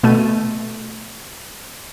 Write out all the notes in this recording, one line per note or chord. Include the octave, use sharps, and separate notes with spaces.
B2 A3 D#7